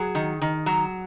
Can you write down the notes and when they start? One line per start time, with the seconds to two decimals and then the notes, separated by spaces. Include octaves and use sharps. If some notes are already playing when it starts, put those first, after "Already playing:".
Already playing: F#3 G#4
0.15 D#3
0.41 D#3
0.66 F#3